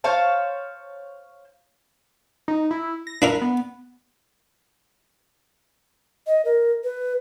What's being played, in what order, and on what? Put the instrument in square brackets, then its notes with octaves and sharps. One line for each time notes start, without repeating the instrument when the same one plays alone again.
[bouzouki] C5 C#5 F5 A5
[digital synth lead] D#4
E4
A#6
[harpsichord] D4 E4 A#4 [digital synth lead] B4
[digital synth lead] B3
[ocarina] D#5
A#4
B4